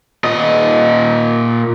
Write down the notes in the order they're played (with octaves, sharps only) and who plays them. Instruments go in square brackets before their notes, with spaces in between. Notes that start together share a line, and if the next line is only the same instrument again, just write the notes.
[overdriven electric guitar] A#2 D#5